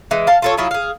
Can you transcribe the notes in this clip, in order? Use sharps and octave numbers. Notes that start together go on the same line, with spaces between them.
E3 G#3
F5 A5
F4 A4 C#5
F#3 E4 F4 G#4
G#4 F5